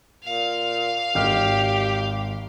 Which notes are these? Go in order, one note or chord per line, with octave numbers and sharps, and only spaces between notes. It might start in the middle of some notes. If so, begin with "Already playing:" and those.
A#2 F5
G#1 G4 D#5 F6